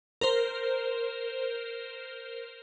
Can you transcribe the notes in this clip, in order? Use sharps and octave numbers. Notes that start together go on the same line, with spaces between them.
A#4 C5